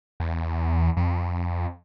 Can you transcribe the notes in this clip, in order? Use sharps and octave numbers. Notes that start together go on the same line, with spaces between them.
E2
F2